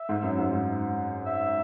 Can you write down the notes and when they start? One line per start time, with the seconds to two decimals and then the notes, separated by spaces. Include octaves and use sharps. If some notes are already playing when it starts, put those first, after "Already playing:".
Already playing: E5
0.09 G#2
0.23 F#2
0.38 G#2
0.53 G#2
1.26 E5